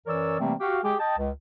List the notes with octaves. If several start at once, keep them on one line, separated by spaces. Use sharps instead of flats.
F#2 E3 A#4 C#5 D5 E6
C3 E3 G3 A3 A#3 C4
F#4 G4 F5
G#3 G4 G#4
D#5 G5 A5
C#2